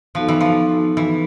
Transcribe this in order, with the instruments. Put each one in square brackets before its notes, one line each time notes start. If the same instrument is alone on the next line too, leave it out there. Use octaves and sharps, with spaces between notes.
[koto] F3 [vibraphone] B3 D#4 F#4 A4
[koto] E3
F3
E3